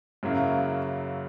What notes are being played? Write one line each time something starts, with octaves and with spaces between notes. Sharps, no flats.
F#2 C#3 F#3 A#3 E4